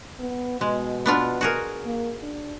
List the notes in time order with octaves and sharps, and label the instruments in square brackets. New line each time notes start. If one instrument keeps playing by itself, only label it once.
[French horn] B3
[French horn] B2 [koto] G#3
[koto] B3 D4 F4
F#4 G#4 A#4
[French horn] A#3
D4